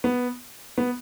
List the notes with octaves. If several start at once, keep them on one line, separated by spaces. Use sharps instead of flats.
B3
B3